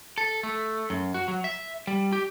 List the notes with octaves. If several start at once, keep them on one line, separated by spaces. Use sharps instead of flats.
A4
A3
F#2
F#4
F#3
E5
G3
G4